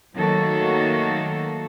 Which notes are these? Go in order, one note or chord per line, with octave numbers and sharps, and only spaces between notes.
D#3 F#3 A3 A#3 F#4 A4